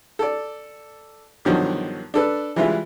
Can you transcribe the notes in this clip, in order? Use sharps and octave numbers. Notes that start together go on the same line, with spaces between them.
A4 D5
G2 B2 D3 D#3 F3 F#3
D4 A4 B4
E3 G3 G#3 E4 F4 B4